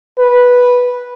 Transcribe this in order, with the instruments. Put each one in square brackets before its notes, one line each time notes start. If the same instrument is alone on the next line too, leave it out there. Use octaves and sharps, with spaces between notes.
[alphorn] B4